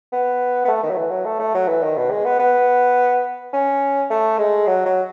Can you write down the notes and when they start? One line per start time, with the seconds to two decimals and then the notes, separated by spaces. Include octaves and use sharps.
0.12 B3
0.65 B3
0.68 A3
0.83 D#3
0.90 F#3
0.97 E3
1.11 F#3
1.25 A3
1.39 A3
1.54 F#3
1.68 E3
1.83 D#3
1.97 B2
2.11 G#3
2.25 B3
2.39 B3
3.53 C#4
4.10 A3
4.38 G#3
4.67 F#3
4.86 F#3